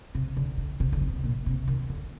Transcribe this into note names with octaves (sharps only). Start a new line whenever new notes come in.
C3
D3
D3
C3
D3
C3
A#2
C3
D#3
D3